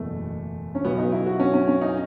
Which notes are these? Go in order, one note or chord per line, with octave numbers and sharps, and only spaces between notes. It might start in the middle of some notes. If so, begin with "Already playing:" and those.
Already playing: F#1 E2 B2 A3
C#4
B1 B2 F#3 B3
D#4
E4
F#4
C#4
C#4
C#4
D#4